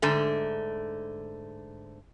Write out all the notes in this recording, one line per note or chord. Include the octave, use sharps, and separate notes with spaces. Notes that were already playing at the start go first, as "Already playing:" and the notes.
G#2 D3 A3